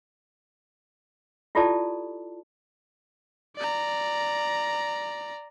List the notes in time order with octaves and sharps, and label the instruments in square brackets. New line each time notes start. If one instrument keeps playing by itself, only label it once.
[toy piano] E4 F4 G4 A4 D5 A5
[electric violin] D5 A#5